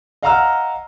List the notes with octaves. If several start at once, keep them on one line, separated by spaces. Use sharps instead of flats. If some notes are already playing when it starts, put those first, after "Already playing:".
D#5 F5 F#5 A#5 E6 F6